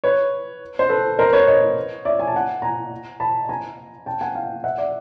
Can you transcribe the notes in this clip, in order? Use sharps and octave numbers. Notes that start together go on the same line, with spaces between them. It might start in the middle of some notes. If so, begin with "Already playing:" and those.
B4 C#5
C5
A4 B4
A#4 C5
B4 C#5
C#5 D#5
D5 E5
G#5
A5
F#5 G#5
G#5 A#5
A5 B5
G#5 A#5
G5 A5
F#5 G#5
F5 G5
E5 F#5
D5 E5